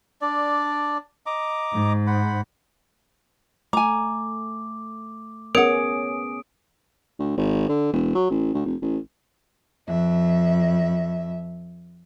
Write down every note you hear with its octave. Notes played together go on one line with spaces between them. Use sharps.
D4 D5
D#5 A#5 D6
G#2
C5 F#5 B5
A3 G#5 A#5 D6
B3 C#4 G#4 A#4 C#5 F#5 D#6 D7
D2
G#1
D3
E1
F#3
A1
D2
F1
A1
F2 E5